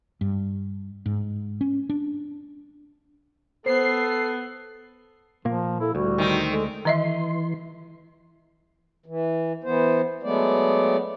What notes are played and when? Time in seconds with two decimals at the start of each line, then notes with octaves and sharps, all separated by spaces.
0.21 G2
1.06 G#2
1.61 C#4
1.89 D4
3.66 B3 A4 C5 C7
5.45 A#2 F3 A#3
5.81 E4 A4
5.95 D2 G3 F#4
6.18 D#3 C4
6.51 G#3 A4
6.85 D#3 E3 D#5 E5 C6
9.06 E3
9.64 E3 B3 C5
10.23 F#3 G#3 A3 B3 D5